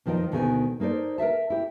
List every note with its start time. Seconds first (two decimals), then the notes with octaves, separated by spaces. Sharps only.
0.06 F2 D#3 F3 F4 A#4 D#5
0.32 D2 B2 D#3 A4 G5 G#5
0.80 A#3 D#4 A4 C5 D5
1.18 A#4 B4 E5 A5
1.50 E4 G4